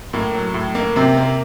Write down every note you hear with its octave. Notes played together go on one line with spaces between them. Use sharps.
A2 A#3
F#3
A2
A#3
C3 C4
A#3